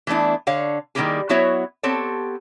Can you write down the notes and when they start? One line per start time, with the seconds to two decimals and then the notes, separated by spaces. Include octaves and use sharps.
0.07 E3 A3 B3 D4 E4
0.47 D3 C#5 F5
0.95 D#3 G3 A#3 E4 G4 G#4
1.29 F#3 B3 E4 F#4 C#5 E5
1.83 B3 C4 G4 A4 C#5